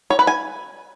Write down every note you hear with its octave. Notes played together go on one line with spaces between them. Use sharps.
C#5
B4
G#5